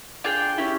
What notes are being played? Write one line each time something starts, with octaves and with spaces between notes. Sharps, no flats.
D4 F4 G#4 G5
C#4 E4 G4